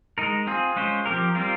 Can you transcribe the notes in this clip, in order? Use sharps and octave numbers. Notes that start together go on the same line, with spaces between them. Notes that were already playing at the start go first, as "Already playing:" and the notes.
G#3 D#4 A#4
C4 F4 G#4
G#3 C#4 F4 C5
F3 C4 G4 A#4
G3 C4 F4 A#4